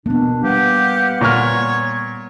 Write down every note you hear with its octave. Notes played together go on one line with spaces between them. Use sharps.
B2 A#3 B3 D4
G3 G4 B4 F5 F#5
A#2 C#5 C#6 F6